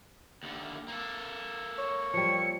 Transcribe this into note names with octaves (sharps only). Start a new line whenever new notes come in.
D#2 D3
A#3 A4
C#5
F3 G3 C#7